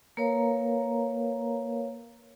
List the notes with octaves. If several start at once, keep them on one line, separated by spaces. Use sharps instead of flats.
A#3 A#4 B4 C#5 F5 A#5